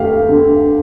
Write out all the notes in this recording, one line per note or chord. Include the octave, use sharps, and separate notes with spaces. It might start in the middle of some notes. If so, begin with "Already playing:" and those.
Already playing: D2 A3 G4 F5
D3